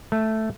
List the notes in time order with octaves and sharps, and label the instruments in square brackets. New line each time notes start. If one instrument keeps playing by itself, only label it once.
[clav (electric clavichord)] A3